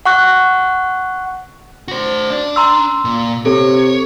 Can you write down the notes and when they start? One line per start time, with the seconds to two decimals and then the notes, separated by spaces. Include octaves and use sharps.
0.05 F#5 C#6 F#6
1.88 F#4 C5
2.31 D4
2.56 A#5 C6 E6
3.05 A#2
3.46 C3 A4 C#5